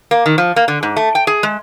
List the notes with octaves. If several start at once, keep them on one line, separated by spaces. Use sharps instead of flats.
A#3
D#3
F3
A#3
D3
G#2
A3
G5
G#4
G#3